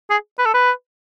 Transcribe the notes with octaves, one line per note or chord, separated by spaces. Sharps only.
G#4
B4
A4
B4